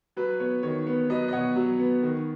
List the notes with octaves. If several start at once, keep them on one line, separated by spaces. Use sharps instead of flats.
F#3 B4
B3 C#5
D#3 C#5
B3
F#3 B4 D#5
D#5
B2 C#5 F#5
F#3
B3
D#3